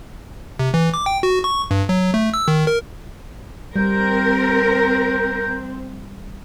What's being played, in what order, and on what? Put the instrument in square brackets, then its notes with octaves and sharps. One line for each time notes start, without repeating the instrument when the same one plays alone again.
[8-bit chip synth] C3
E3
D6
G5
F#4
C#6
G2
F#3
A3
E6
D#3
A#4
[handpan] G3 [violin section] C4 [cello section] A#4 [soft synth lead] G6